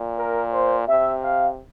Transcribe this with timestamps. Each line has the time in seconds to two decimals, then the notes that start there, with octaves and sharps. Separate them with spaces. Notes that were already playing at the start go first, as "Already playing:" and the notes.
Already playing: A#2
0.18 A#4
0.53 C5
0.88 C3 E5
1.23 F5